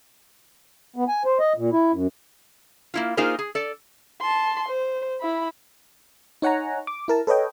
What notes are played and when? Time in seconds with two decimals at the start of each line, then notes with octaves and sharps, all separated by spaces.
0.96 B3
1.08 G#5
1.25 C5
1.39 D#5
1.57 A#2
1.72 E4
1.92 F#2
2.94 A#3 E4 F4
3.17 A#3 D#4 F4 G#4 A#4 C5
3.39 G#4
3.55 A4 D5
4.21 A5 C6
4.69 C5
5.21 E4 B5
6.42 D#4 C#5 F#5 G#5 A#5
6.87 D6
7.08 E4 A#4 A5
7.27 A4 B4 C#5 D#5 G5